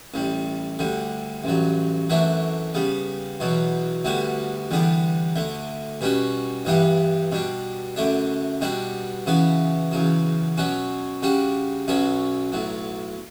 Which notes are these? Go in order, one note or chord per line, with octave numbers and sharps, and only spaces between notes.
A1 A2 G3
D2 D3 G3
A1 G2 F#3
F#2 E3 A3 D4 F#4
C#3 G3 B3
E2 B2 F#3
D2 D3 G3 B3 F#4
E2 D3 G3 B3 D4
D2 D3 A3
B2 G3 C#4 F#4
G2 E3 G3 B3 D4
B2 G3 D4
F#2 D3 A3 D4
B2 G3 D4 F#4
C#3 E3 B3 F#4
E2 C#3 F#3
B2 F#3 C#4 F#4
C#3 G3 D4 F#4
B1 B2 F#3 C#4 F#4
B1 A2 F#3